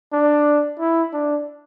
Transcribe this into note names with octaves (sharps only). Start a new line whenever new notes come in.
D4
E4
D4